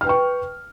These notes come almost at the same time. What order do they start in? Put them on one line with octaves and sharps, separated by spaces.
F6 B4 G5 C#6